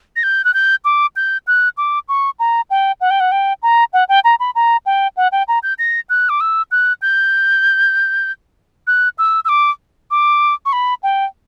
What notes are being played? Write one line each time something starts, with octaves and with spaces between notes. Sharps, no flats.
A#6
G6
F#6
G6
D6
G6
F#6
D6
C#6
A#5
G5
F#5
G5
F#5
G5
A#5
F#5
G5
A#5
B5
A#5
G5
F#5
G5
A#5
G6
A#6
F#6
D6
E6
F#6
G6
F#6
E6
E6
D6
D6
C#6
B5
G5